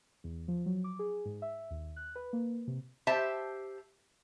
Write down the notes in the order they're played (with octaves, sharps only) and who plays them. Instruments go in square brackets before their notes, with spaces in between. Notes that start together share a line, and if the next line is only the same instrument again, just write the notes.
[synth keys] E2
F3
F#3
D6
G#4
G#2
E5
D#2
F#6
B4
A#3
C3
[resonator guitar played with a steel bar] G4 C5 E5 A5